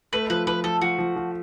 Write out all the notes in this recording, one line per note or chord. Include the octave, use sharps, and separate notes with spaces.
A3 B4
F3 B4
F3 B4
F3 A4
F3 F#4
F3
F3